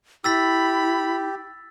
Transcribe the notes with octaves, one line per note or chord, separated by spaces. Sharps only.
E4 G4 B5 E6 A6 B6